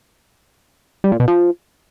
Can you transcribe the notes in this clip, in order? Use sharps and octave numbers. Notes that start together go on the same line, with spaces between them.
G3
A#2
B2
F3